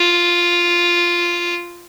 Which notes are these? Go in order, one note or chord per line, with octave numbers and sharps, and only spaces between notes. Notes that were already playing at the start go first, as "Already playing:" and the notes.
Already playing: F4